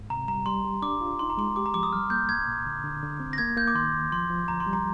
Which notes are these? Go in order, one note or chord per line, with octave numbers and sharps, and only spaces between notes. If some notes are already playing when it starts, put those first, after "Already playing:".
Already playing: G#2
C3 A#5
G3 A#5
G3 C6
G4
D4 D6
F4
D#4 C6
A#5
G#3 C6
G4 D6
A#5
F3 D6
D#6
G3 F6
A#3 G6
C2 G#6
A#2
D3
D3
D3
C4
A#6
A#3 G#6
A#3 G6
D6
D#3 C6
D#2
F3 C6
F3
D2 A#5
C6
G3
A#5